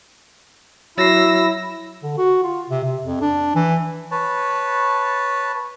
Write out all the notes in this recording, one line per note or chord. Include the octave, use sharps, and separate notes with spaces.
F#3 E4 E6 A#6 C7
D3
F#4
F4
C3
C3
F2
D4
E3
B4 C#5 A5